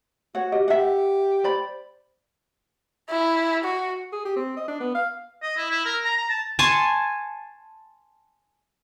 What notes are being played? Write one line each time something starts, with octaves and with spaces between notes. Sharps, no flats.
F#4 C#5 F#5
G4 D#5
G4 E5 F#5
C5 D5 B5
E4
F#4
G#4
G4
C4
D#5
D4
B3
F5
D#5
E4
E4
A#4
A#5
A#5
A5
G#5 A5 C6 C#6